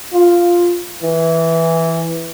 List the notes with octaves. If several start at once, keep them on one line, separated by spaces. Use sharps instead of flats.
F4
E3